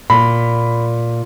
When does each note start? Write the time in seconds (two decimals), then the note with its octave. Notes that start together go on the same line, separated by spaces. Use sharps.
0.10 A#2 B5